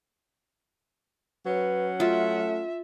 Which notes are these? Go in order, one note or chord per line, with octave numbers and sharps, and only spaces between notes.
F#3 C#4 B4 F#5
A3 F4 E5